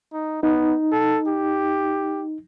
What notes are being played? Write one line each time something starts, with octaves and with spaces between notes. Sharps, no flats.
D#4
B3 D#4
A4
G4